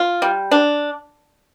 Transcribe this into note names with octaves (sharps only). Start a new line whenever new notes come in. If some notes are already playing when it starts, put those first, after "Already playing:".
Already playing: F4
G3
D4